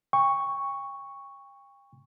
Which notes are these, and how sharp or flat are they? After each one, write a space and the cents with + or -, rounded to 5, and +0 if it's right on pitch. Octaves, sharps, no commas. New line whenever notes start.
G5 +40 C#6 +0